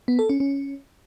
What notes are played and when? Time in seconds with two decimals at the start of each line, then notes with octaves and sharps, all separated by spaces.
0.08 B3
0.19 A4
0.29 C#4
0.40 C#4